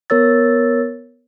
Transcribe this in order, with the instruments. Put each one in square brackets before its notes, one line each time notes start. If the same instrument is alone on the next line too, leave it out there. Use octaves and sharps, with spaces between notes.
[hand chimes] B3 A#4 C#5 E6 A6